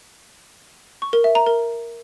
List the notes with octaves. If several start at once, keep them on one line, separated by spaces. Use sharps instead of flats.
C#6
A#4
E5
A#5
A#4